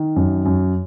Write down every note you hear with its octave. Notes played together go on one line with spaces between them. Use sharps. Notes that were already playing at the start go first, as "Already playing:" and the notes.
Already playing: D#3
F#2
F#2